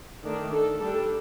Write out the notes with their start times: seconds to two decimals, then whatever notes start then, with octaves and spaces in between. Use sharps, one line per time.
0.24 D#3 A3 D4
0.52 A4
0.80 G3 D4 A4